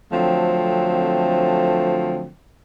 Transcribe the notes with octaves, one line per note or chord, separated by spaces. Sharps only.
D3 F3 F#3 A3 C4